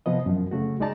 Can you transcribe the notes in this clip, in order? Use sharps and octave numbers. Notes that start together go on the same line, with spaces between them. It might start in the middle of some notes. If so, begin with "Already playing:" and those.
C3 F3 B3 D#5
F#2 F3
C#3 A3 F#4
C#2 G#3 D#4 D5 A5 A#5